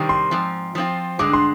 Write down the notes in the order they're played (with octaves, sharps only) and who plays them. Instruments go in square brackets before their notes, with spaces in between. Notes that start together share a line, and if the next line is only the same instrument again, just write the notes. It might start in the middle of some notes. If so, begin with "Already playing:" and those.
Already playing: [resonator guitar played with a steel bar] C3 D#3 G3 C4
[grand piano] C6
[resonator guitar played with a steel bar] G#2 F3 C4
F3 C4 F4
[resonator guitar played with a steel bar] G2 D3 G#3 D4 [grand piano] D6
[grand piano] C6